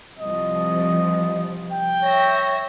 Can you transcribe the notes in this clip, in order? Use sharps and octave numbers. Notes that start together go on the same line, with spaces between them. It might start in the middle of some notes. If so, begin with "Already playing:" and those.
C2 F3 D#5
G5
C#5 E5 A#6